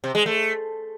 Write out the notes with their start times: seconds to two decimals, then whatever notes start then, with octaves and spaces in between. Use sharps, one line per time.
0.04 C3
0.15 G#3
0.26 A3